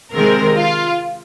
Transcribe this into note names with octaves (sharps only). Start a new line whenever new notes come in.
C3 D#3 G#3 C4 A#4
F4